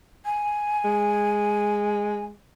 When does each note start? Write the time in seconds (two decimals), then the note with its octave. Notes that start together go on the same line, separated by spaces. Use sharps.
0.25 G#5
0.85 G#3